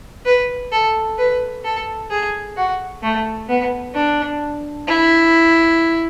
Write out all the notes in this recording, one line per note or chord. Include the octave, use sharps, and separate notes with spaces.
B4
A4
B4
A4
G#4
F#4
A3
B3
D4
E4